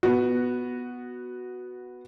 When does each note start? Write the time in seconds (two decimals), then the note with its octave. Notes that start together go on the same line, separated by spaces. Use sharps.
0.03 B3 F#4